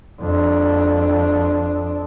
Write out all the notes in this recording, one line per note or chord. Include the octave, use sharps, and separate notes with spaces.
F2 D4